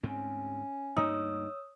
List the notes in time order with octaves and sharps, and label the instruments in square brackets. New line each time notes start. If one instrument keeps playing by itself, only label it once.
[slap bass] D2 G#2 C4 [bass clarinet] C#4
[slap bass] D2 G2 A#3 [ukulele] D#4 [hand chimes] C#5 D#6 E6